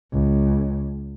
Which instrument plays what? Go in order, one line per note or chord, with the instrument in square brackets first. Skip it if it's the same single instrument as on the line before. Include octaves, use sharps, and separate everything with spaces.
[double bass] C#2